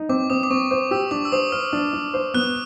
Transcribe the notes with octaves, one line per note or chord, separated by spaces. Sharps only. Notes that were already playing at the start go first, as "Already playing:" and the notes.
Already playing: D#4
C4 D6
C4 D#6
D6
C4 C#6
C5 D6
G4 E6
D4 D6
E6
C5 D#6
C5 F6
D4
D4
C5
B3 F#6